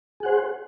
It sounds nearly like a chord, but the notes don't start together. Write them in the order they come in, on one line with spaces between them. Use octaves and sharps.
G#4 F#5 C5